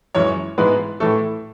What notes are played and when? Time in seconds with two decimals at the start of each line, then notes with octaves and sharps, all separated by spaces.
0.15 F#2 E3 G#3 C#5
0.58 G#2 E3 G#3 B3 B4
1.00 A2 E3 A3 A4